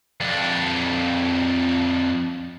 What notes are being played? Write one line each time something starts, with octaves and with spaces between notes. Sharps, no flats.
F2 D4